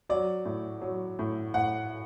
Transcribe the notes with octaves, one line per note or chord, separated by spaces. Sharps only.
F#3 D5
A2
F#3
A2
A2 F#5